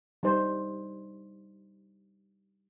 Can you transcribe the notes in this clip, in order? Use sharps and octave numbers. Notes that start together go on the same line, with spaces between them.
G3 D#4 C5